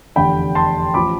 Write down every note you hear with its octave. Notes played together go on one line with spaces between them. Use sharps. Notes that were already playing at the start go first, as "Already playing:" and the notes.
F1 E2 D3 G5 B5
A5 C6
A1 F3 B5 D6